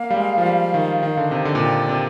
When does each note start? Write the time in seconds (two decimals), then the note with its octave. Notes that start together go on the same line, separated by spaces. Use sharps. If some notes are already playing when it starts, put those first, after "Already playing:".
Already playing: A#3 F5
0.10 G3
0.16 G#3
0.38 F3
0.46 G3
0.74 D#3
1.02 D#3
1.17 D3
1.31 C3
1.45 D3
1.55 A#2
1.60 C3 G5
1.89 C3